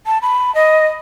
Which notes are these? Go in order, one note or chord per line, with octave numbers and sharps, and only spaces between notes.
A5
B5
D#5